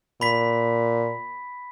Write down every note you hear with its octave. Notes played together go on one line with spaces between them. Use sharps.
A#2 B5 B6